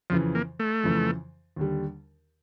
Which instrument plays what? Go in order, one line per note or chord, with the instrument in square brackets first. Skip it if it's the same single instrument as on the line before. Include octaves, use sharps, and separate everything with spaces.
[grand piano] F2 C#3 E3 [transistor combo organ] F3
[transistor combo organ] A#3
A3
[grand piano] F2 C#3 E3
D#2 D3 G3